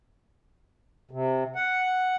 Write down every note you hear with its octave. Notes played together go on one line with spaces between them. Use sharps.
C3
F#5